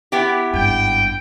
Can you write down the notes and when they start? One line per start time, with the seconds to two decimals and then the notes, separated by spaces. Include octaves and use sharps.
0.12 B3 E4 G4
0.54 G#1 G2 G5